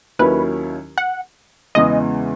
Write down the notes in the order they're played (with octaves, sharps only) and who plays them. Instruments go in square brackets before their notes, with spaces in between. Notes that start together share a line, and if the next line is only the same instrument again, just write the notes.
[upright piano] D#2 D#3 F#3 C#4 E4 [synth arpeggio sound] B4
[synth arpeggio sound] F#5
[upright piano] E2 C#3 E3 G#3 [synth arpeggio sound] D#5